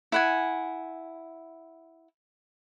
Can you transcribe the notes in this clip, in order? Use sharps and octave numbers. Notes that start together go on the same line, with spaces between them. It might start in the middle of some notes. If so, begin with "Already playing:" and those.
E4 F#5 G#5